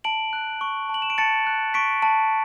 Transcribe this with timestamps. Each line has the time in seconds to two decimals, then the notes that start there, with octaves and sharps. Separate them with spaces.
0.04 A5 D7 F#7
0.33 F#6
0.61 C#6
0.89 A5 F#7
1.02 E7
1.10 D7
1.18 A5 A6 C#7
1.47 F#6
1.74 C#6 B6 D7
2.02 A5